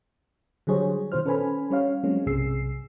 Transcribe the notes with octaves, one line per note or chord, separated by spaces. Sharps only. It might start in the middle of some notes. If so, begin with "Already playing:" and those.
D3 F#3 G3 G#4 C5 C#5
B2 D#3 F4 C5 F6
C#4 A4 B4 C5 G#5 B5
G3 C#4 C#5 F5
F#3 G#3 A#3 C4 C#4
B1 G2 C3 G#4 E6 C7